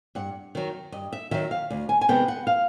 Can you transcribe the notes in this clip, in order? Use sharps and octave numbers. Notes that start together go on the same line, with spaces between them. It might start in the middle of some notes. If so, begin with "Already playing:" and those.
G2 F#5
D#3 F#3
G2 D#5
E5
D#3 F#3 E5
F5
D2
G#5
G#5
C3 D#3 G#3 B3 G5
F#5
F5